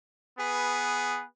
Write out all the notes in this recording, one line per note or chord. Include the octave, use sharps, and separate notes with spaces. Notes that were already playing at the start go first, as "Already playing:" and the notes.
B3 G#4 B4